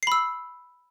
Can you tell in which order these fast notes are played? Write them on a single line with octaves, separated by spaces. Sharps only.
C7 B5 E6